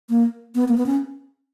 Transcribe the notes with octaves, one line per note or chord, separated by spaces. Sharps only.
A#3
B3
A#3
B3
C#4